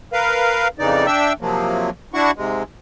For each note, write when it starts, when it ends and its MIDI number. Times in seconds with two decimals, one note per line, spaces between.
0.13 0.68 70
0.13 0.68 71
0.13 0.68 77
0.79 1.06 41
0.79 1.06 49
0.79 1.06 52
0.79 1.06 63
0.79 1.06 74
1.06 1.33 62
1.06 1.33 76
1.06 1.33 79
1.06 1.33 88
1.41 1.90 48
1.41 1.90 53
1.41 1.90 54
1.41 1.90 58
2.14 2.31 62
2.14 2.31 64
2.14 2.31 66
2.14 2.31 78
2.14 2.31 85
2.36 2.63 44
2.36 2.63 48
2.36 2.63 56